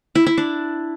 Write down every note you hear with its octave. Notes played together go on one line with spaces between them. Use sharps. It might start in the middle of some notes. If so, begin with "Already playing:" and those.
E4
E4
D4